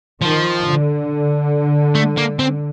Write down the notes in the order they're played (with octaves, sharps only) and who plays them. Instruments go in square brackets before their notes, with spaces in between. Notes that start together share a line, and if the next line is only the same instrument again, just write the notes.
[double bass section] D#3 [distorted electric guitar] F3
[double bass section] D3
[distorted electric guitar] A3
A#3
C4